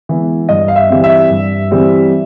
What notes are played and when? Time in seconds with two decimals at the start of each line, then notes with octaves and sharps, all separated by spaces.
0.09 E3 G#3 B3
0.49 G2 D#5
0.68 F5
0.76 E5
0.89 E3 G3 C4
1.04 E5
1.31 G2
1.71 E3 G3 C4